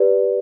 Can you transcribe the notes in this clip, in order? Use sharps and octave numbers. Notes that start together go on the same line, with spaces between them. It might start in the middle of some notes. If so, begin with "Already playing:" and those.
Already playing: G4 B4 D5